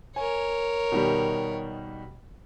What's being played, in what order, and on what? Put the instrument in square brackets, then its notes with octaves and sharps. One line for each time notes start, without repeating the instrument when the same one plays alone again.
[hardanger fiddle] A#4 C#5 [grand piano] G#5
[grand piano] B2 D#3 G3